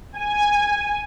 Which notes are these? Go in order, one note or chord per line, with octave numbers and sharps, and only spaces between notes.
G#5